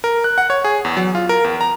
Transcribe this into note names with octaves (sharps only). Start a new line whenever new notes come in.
A#4
F#6
F#5
C#5
G#4
E2
F#3
F4
A#4
E2
A#5